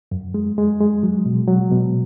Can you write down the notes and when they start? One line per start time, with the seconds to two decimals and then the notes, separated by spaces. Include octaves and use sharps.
0.11 F#2
0.34 G#3
0.58 G#3
0.80 G#3
1.03 F#3
1.25 B2
1.48 F#3
1.71 B2